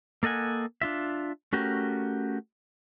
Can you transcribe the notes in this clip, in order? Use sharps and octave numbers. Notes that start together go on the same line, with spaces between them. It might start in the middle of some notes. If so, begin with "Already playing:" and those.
A#3 A4 D#5 F#5 G#5
D4 F4 E5
A3 C#4 F#4 G4 A#4